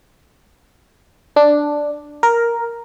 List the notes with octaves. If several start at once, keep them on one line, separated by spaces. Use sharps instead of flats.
D4
A#4